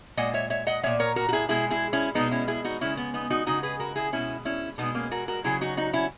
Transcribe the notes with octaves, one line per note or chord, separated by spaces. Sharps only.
A#2 G#3 D#5 F#5
C#5 E5
C#5 E5
D#5 F#5
A#2 G#3 C#5 E5
A#4 C#5
F#4 A#4
F#4
E4 G#4
B2 G#3 E4 G#4
E4 G#4
C#4 E4
B2 G#3 B3 D#4
C#4 E4
E4 G#4
D#4 F#4
C#3 G#3 C#4 E4
B3
B3 D#4
D#4 F#4
C#3 G#3 D#4 F#4
G#4 B4
F#4 A#4
E4 G#4
B2 G#3 C#4 E4
C#4 E4
B2 G#3 B3 D#4
A#3 C#4
F#4 A#4
F#4 A#4
C#3 F#3 E4 G#4
D#4 F#4
D#4 F#4
C#4 E4